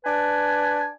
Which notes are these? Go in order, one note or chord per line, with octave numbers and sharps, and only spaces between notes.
D4 B4 G#5